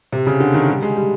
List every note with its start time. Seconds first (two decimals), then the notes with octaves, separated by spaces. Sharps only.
0.12 C3
0.27 C#3
0.40 D3
0.54 D#3
0.68 G3
0.82 G#3
0.96 G3